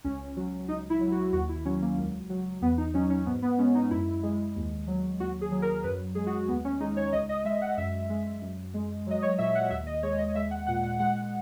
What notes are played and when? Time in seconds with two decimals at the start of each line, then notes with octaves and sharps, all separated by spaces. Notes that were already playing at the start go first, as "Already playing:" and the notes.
0.04 C#2 C#4
0.37 F#3
0.68 C#2 D#4
0.90 E4
1.01 F#3
1.12 F#4
1.33 D#2 F#4
1.49 E4
1.65 F#3 C#4
1.82 A#3
1.98 C#2
2.30 F#3
2.61 E2 B3
2.78 D#4
2.94 F#3 C#4
3.10 C#4
3.26 G#2 B3
3.42 B3
3.59 G#3 C#4
3.75 D#4
3.91 F#2 E4
4.23 G#3
4.56 D#2
4.87 F#3
5.20 D#2 F#4
5.41 G#4
5.51 F#3
5.62 A#4
5.84 F#2 B4
6.15 G#3 G#4
6.27 F#4
6.48 D#2 B3
6.65 C#4
6.80 G#3 D#4
6.97 C#5
7.12 C#2 D#5
7.29 D#5
7.45 G#3 E5
7.61 F#5
7.77 F#2 E5
8.10 G#3
8.42 F#2
8.74 G#3
9.07 F#3 D#5
9.22 C#5
9.38 A#2 E5
9.55 F#5
9.70 D#2 E5
9.87 D#5
10.03 G#3 C#5
10.18 D#5
10.35 G#3 E5
10.51 F#5
10.67 A#2 F#5
10.83 F#5
10.99 G#3 F#5